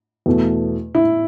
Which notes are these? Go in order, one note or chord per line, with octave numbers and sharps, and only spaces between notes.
E2 B2 A3
E4